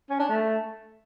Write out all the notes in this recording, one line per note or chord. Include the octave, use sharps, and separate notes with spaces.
C#4
D4
A3